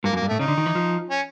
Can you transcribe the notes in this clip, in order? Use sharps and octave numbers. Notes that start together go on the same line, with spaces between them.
G2 A#3
F#2
A#3
G2
A2 A3
C#3 D#4
D3
D#3
E3
F3
C#4